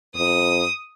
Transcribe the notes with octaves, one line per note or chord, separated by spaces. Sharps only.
F2 D#6